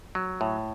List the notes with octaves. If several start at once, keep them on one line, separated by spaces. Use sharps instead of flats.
F#3
A2